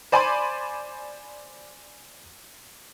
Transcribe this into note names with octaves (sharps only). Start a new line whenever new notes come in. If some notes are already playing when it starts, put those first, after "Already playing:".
C5 D5 G#5 B5 C6 D6